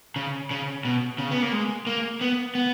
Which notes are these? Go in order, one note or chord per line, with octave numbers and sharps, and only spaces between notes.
C#3
C#3
B2
C#3
B3
A#3
G#3
A#3
B3
B3